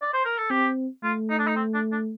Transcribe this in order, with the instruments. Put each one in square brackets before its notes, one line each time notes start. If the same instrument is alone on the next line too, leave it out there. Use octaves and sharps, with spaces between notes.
[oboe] D5
C5
A#4
A4
[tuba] C4 [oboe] G4
[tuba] A3 [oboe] F4
[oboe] D#4
D4
D#4
C4
D4
D4